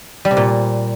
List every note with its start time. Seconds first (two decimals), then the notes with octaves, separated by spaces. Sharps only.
0.25 G3
0.31 C3
0.37 A#2